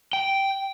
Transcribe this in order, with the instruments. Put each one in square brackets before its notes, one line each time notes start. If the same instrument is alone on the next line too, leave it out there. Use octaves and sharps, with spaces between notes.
[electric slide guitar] G5